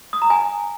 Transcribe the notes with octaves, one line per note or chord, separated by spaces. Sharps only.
D#6
A#5
G#5